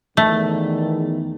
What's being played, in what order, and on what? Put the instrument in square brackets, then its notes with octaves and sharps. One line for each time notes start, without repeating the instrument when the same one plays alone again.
[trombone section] E2 D#3 [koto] A3